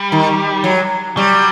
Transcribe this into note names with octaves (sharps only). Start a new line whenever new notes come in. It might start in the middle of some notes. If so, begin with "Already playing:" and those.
Already playing: G3
D#3
F#3
F#3 G3